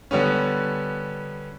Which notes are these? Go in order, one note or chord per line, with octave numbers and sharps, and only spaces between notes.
D3 G3 B3 C#4